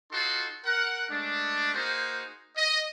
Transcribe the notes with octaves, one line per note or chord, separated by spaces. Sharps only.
D#4 F4 F#4 A4 C6
A#4 F#5
G#3 A3 D4
A#3 D#4 F#4 G#4 C5
D#5